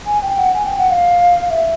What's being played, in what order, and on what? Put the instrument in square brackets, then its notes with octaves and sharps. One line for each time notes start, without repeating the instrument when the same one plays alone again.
[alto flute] G#5
G5
F#5
G#5
G5
F#5
F5
E5